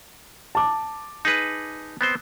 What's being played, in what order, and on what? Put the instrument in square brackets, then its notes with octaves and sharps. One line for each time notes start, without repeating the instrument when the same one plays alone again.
[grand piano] A5 D6
[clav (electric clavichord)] D#4 G#4 B4
B3 C4 C5